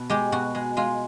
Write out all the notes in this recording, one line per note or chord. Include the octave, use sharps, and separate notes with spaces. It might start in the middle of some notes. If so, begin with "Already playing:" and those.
Already playing: B2
G#3 G4
B2 F#4
G#3
G#3 F4